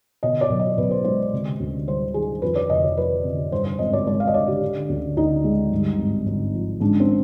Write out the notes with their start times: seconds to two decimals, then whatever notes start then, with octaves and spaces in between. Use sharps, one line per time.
0.23 B2 D#5
0.41 D5
0.50 B1
0.59 D#5
0.77 B1 B4
0.91 C5
1.04 G#3 C5
1.33 C3
1.60 D2
1.87 G3 C5
2.14 D#3 G#4
2.42 F2 B4
2.56 D5
2.70 F1 D#5
2.83 D5
2.97 F3 B4
3.24 C3
3.52 G2 C5
3.65 C5
3.79 G#1 D#5
3.93 D5
4.06 G#3 D5
4.20 F5
4.27 D#5
4.34 D3 D5
4.48 G4
4.61 D3
4.89 D2
5.17 D2 D#4
5.44 G#3
5.72 G2
5.99 G#1
6.26 G#1
6.54 F3
6.81 G#2 D4
7.00 C4